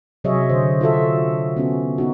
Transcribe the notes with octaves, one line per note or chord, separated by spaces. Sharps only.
C3 F#3 G#4 C#5 D#5 E5
D3 C5
F4 F#4 A4 E5
B3 C#4 F#4
B3 D#4 F#4